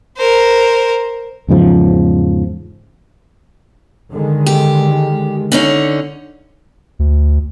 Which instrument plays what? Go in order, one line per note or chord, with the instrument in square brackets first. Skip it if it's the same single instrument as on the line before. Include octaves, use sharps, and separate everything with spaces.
[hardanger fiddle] A#4 C5
[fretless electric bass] E2 G#2 C#3 F3
[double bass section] D3 D#3 G#3
[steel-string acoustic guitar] G4
D3 C#4 D#4
[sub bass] D2